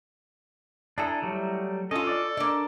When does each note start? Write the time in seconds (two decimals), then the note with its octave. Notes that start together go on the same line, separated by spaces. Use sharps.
0.98 D4 E4 G#4 A4 A#5
1.22 F#3 G3 A3
1.91 C#4 F4 A4 D#5
2.07 D5 D6
2.37 A#3 D4 D5